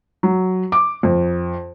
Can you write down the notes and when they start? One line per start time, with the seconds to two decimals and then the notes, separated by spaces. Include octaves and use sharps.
0.23 F#3
0.72 D6
1.03 F2